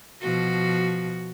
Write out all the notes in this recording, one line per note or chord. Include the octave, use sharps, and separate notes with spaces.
B2 F3 F#4